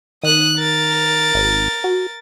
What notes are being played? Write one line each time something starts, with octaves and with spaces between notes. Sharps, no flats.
D#3 D#6 F#6
A#4 A6
G#1
F#4